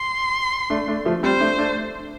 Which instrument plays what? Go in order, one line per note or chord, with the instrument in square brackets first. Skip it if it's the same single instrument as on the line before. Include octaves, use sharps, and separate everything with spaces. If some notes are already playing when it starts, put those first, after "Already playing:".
Already playing: [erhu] C6
[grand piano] A3 D4
A3 D4
F3 A3
[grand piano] G3 C4 [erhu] C5
[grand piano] A3 D4
A3 D4